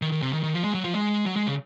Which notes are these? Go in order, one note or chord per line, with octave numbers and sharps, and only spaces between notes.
D#3
D#3
C3
D#3
D#3
F3
G#3
F#3
F3
G#3
F#3
G#3
C#3